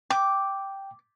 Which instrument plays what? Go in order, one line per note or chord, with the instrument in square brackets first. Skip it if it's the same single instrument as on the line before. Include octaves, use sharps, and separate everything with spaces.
[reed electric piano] G5 [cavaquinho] D6